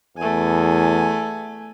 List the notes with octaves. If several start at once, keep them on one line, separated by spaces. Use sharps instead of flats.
E2 A3 G#5